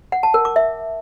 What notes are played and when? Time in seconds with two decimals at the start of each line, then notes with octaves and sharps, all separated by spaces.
0.12 F#5
0.23 A5
0.34 A#4
0.45 D6
0.56 E5